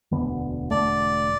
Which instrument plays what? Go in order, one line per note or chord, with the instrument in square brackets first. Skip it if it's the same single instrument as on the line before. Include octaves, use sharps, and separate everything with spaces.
[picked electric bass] E1 D2 D3 B3
[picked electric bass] E1 E2 D3 A3 [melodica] D5